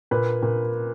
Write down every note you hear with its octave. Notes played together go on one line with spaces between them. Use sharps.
A#2 B4
A#2